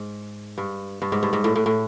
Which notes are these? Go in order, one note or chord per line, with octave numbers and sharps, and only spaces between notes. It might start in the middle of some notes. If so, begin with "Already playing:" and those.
Already playing: G#2
G2
G2
G#2
G2
G#2
A2
A2
A2